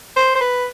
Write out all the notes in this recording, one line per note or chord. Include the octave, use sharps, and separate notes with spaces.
C5
C5
B4